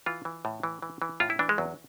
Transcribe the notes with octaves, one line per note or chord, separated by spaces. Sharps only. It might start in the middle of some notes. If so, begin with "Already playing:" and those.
E3 F4
E3
A2
E3
E3
E3
A2 F4
E4
E3 D4
G#3
E2 F#3